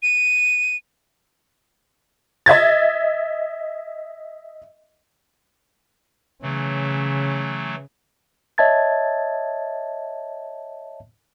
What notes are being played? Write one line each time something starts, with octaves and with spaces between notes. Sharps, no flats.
D#7
D#5 E5 G#6 A6
C#3 E3 F#3 A3
C#5 D#5 E5 A5 G#6 A6